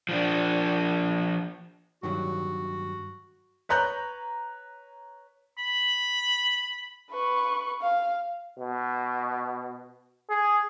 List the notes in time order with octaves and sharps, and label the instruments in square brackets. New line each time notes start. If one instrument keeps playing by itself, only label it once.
[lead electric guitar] F3 D4
[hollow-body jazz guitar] G2 D#3 F#3 [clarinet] F#4
[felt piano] B4 C#5 A#5 F#6 G6
[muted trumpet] B5
[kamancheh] B4 C#6
F5
[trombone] B2
G#4